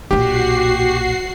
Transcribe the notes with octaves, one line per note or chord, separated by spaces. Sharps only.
B1 A#2 F#4 G4 C7